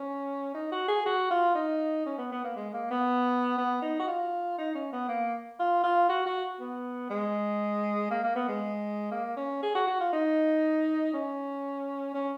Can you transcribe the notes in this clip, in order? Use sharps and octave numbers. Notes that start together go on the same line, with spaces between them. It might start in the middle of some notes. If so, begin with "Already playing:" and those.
Already playing: C#4
D#4
F#4
G#4
F#4
F4
D#4
C#4
B3
B3
A#3
G#3
A#3
B3
B3
D#4
F#4
F4
D#4
C#4
B3
A#3
F4
F4
F#4
F#4
B3
G#3
A#3
A#3
B3
G#3
A#3
C#4
G#4
F#4
F#4
F4
D#4
C#4
C#4